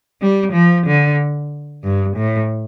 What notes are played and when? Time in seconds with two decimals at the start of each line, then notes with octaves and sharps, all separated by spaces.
0.20 G3
0.53 F3
0.85 D3
1.82 G2
2.15 A2